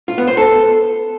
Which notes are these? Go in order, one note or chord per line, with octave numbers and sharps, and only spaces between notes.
F4
B3
C5
A4